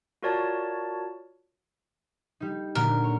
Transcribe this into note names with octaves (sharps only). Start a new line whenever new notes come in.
F4 F#4 A#4 C#5 D5 A5
G3 D#4
A#2 D3 F#3 A#4
C#5